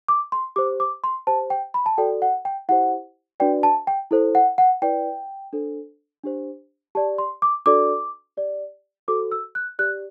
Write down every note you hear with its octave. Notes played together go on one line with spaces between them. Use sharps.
D6
C6
G4 C5 D6
D6
C6
G4 C5 A5
G5
B5
A5
F#4 A4 D5 G5
F#5
G5
E4 G4 C5 F#5
D4 F#4 B4 D5 G5
A5
G5
E4 A4 C5
F#5
F#5
E4 B4 D5 G5
D4 A4 C5
D4 G4 C5
G4 D5 A5
C6
D6
D4 F#4 A4 D5 D6
G4 D5
F#4 A4 C5 D6
E6
F#6
G4 D5 F#6